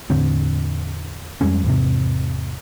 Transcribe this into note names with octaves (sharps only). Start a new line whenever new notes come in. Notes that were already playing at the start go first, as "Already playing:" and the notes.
E2 A2 D3 C4
F2 G3 G#3 C#4
E2 G#2 C3